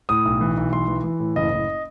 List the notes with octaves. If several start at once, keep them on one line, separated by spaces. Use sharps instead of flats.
A2 D#6
B1
E3
B1
E3 C6
E3
E3
A2
F#1 D#5
F#1